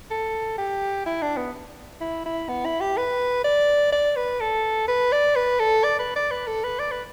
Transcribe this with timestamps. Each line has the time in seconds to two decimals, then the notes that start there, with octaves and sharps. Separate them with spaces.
0.11 A4
0.58 G4
1.06 E4
1.22 D4
1.37 B3
2.01 E4
2.25 E4
2.49 B3
2.65 E4
2.81 G4
2.97 B4
3.44 D5
3.92 D5
4.16 B4
4.40 A4
4.88 B4
5.12 D5
5.36 B4
5.60 A4
5.84 D5
5.99 B4
6.16 D5
6.31 B4
6.47 A4
6.63 B4
6.79 D5
6.91 B4